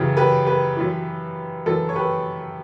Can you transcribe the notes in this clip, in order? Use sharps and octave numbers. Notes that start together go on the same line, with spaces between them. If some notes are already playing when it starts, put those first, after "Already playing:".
Already playing: F#2 C#3 E3 G4
G4 B4
G4 B4
F#2 E3
F#2 E3 A4
C#5
G4 B4